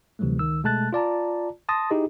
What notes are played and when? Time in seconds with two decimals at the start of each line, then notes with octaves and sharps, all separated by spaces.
0.19 D2 C3 E3 F#3 G3 A3
0.39 C#2 D#3 E6
0.64 B2 G#3 A3 A5 F#6 A6
0.93 F4 D5 A5 A#5
1.69 A5 C6 D#6 A6 A#6
1.90 D#4 E4 G4 G#4 D#5